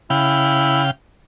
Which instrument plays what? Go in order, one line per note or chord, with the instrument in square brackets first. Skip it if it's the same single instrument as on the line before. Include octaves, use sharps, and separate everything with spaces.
[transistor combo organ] C#3 F5 G5 [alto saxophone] E4